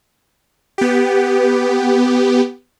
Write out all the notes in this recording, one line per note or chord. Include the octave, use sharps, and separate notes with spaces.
B3 G4